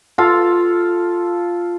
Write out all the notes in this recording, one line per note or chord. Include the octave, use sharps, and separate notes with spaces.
F4 A4 F5